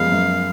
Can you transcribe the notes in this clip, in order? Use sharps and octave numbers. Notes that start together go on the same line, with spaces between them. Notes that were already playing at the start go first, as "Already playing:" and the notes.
Already playing: F#2 F3 G#3 B3 F5
F#2